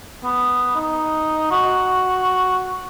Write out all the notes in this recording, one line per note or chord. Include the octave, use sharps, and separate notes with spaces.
B3
D#4
F#4